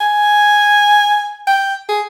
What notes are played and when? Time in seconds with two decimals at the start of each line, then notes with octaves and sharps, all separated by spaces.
0.01 G#5
1.47 G5
1.89 G#4